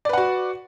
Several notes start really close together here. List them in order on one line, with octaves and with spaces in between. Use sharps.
D5 B4 F#5 F#4